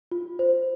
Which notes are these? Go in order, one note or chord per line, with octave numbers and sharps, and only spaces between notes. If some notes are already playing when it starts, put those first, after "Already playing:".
F4
C5